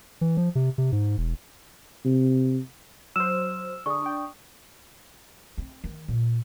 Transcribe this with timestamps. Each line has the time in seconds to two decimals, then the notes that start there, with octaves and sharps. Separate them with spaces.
0.21 E3
0.37 F3
0.55 C3
0.78 C3
0.92 G#2
1.18 E1
2.05 C3
3.16 F#3 C5 E6 F6 E7
3.86 D3 D4 G#4 C#6 D#6
4.02 D4 D5 G5
5.58 C4
5.84 D#3
6.08 A#2